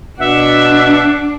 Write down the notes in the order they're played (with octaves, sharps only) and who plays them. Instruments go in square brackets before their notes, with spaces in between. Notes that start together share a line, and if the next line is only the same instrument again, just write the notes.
[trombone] B2 [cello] D4 [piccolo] E5 [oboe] F#5